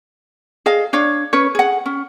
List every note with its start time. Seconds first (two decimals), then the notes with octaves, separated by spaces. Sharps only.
0.66 G#4 D#5 F5
0.93 D4 C#5 F5
1.33 C#4 B4 C#5
1.55 G#4 F#5
1.86 C#4